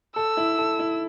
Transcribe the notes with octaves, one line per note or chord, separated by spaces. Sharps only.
A4 E6
E4
A4
E4